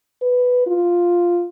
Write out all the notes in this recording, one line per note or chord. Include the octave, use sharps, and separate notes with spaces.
B4
F4